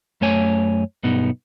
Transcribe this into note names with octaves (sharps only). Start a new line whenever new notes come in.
F#2 A3 C#5 G#5
B1 G2 B3 D#4